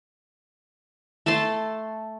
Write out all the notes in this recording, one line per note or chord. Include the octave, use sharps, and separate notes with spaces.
A3 A4 A5 C6